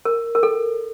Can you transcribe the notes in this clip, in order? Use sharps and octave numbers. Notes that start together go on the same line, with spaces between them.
A#4
A#4
A4